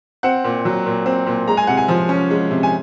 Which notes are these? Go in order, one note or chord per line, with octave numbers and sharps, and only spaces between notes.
C4 F#5
A#2
F#3
A#2
C4
A#2
G#3 A#5
G#5
C3 F#5
G#5
F3
C#4
G#3
C3
G#5